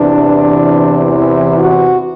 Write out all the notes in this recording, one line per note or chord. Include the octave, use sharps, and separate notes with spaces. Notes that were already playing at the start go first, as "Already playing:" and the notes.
Already playing: E2 C3 E3 D4
E4
F#4